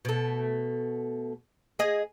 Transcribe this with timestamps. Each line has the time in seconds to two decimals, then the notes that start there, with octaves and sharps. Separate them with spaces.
0.05 B2 A3
1.79 G#4 D#5